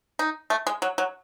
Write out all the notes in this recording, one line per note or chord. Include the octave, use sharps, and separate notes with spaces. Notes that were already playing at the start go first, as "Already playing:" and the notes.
D#4
A3
G#3
F#3
F#3